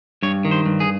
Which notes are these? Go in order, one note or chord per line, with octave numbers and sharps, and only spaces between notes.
G2 C#5
D#3
C5
G2
G#4